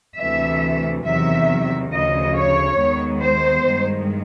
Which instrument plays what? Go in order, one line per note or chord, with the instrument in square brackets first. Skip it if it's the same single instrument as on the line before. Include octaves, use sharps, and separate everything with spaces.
[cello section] D2 C3 E3 A3 E5
E2 C3 D#3 F#3 E5
D2 C#3 F3 D#5
C#5
D#2 D#3 G#3 B3
C5
G2 D#3 G#3